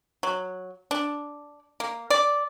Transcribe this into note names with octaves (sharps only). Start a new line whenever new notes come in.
F#3
D4
A#3
D5